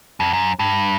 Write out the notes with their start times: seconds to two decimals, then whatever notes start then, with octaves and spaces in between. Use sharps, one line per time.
0.20 F2
0.33 F#2
0.59 G2